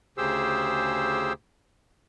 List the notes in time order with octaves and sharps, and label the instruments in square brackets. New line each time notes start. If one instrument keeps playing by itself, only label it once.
[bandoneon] D2 C#3 G4 G#4 C5 E6